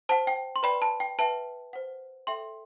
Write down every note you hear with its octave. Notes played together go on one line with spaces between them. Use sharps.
C5 F#5 A5
G5
C6
B4 D5 G5 B5
A5
G5
B4 E5 G5 A5
C5 F#5
A4 E5 G5 C6